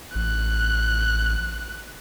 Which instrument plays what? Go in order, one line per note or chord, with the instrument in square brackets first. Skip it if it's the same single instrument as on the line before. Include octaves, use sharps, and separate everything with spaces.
[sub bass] A1 [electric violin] F#6